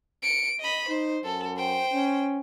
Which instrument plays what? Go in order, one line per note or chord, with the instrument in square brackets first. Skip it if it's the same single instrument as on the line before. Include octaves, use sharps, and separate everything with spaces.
[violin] C#7 D7
D#5 B5
[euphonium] D#4 [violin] C5
[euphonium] F#2 [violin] A4
[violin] C5 G5
[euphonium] C#4